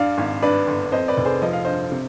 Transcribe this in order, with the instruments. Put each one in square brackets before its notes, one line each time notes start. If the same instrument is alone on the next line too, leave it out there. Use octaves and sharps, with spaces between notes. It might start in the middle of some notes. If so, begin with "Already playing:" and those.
Already playing: [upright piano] G2 D5 F5
G#1
G2 B4 D5
G1
F2 C5 D#5
B4 D5
F1
G#4 C5
F3 D#5
F5
G2 C5 D#5
C3